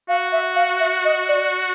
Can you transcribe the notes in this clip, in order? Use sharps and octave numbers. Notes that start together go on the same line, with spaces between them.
F#4 F5
E5
F5
E5
D#5
D5